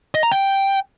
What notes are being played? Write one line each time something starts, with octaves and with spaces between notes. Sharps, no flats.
D#5
A#5
G5